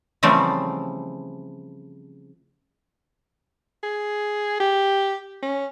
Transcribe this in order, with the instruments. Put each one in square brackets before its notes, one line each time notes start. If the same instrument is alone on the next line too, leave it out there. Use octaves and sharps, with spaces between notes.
[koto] C#3 E3 F3 G3 A3 C4
[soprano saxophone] G#4
G4
C#4